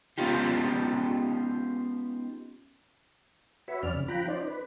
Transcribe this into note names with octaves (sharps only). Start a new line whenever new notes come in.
G#3 B3 C#4 D#4 F4 G4
F#4 B4 C#5 E5
F2 C#4 D5 F6
C#3
F3 F4 G5 A#5 B5 F#6
C#4 D#4 C5 D5
B4